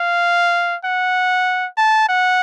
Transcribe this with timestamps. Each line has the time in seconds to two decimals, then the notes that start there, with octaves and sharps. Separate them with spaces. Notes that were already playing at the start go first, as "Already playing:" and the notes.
Already playing: F5
0.84 F#5
1.77 A5
2.09 F#5